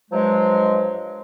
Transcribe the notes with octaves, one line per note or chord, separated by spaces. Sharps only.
G2 F3 F#3 G#3